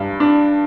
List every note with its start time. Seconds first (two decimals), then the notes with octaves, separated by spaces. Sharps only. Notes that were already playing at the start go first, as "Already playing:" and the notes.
Already playing: G2
0.20 D4